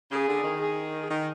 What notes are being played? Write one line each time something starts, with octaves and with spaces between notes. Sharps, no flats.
C#3 G#4
D3
D#3
G#4
D#3